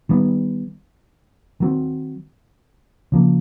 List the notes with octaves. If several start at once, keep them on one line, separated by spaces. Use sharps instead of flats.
D#3 G3 B3
D#3 F#3 A3 C4
C#3 F3 A#3